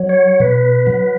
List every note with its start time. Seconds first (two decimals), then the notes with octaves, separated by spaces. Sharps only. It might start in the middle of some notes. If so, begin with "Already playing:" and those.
Already playing: F#3
0.09 C#5
0.40 B2 B4
0.87 F#3